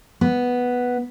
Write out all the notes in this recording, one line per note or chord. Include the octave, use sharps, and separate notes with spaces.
B3